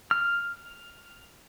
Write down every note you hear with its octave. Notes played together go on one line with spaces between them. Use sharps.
F6